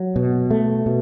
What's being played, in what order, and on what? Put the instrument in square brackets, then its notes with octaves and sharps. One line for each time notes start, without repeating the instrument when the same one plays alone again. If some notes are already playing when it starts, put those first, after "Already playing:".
Already playing: [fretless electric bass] F#3
B2
A3
B2